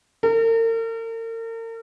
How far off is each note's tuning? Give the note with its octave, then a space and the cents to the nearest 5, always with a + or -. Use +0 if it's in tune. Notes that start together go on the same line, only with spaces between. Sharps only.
A#4 -40